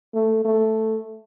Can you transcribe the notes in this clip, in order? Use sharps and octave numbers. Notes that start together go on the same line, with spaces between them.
A3
A3